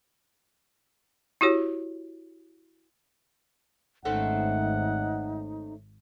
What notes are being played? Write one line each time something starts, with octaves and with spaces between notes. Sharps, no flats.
E4 F#4 G4 C#5
G#1 A3 C4 C#4 D#4 F#5